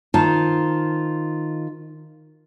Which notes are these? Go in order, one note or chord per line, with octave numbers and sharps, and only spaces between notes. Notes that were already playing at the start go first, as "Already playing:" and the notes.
D#3 F4 C5 A5